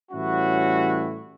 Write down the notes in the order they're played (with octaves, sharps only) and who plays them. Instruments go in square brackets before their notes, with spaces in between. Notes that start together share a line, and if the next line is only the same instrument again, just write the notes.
[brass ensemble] A2 E3 G3 C#4 E4 F#4